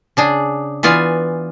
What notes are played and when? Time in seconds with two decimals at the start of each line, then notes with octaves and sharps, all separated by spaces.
0.17 C#3 D4 G#4
0.83 E3 B3 F4 D5 F5 G#5